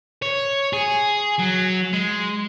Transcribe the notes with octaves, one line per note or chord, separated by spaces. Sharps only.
C#5
G#4
F#3
G#3